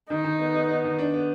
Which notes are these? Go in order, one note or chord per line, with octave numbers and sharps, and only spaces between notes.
D#3 D#4
D#3
B3
B3
B3
D#3
D4
B3